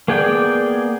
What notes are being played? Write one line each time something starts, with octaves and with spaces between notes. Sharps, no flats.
A#3 B3 G#4 D5 G5